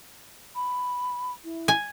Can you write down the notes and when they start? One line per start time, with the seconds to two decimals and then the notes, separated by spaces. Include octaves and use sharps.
0.56 B5
1.44 E4
1.68 G#5